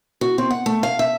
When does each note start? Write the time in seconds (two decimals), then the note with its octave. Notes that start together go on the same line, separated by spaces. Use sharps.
0.21 F#4
0.38 C4
0.51 F#5
0.66 A3
0.83 F5
0.99 E5